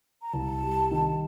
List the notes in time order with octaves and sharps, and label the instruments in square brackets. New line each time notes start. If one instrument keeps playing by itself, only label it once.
[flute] A#5
[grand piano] C2 [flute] A5
[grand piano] G3
D#3